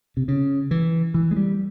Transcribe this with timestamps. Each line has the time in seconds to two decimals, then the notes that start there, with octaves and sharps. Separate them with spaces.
0.17 C3
0.28 C#3
0.71 E3
1.14 E3
1.31 G#3
1.37 G3